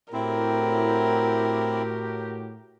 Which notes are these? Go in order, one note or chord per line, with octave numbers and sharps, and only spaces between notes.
A2 C4 E4 F#4 G4 A#4